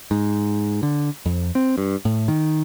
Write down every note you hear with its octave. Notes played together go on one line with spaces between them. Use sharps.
G#2
D3
F2
C4
G2
A2
D#3